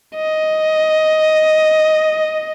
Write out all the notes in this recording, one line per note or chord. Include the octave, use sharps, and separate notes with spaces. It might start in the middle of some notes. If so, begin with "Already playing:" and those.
D#5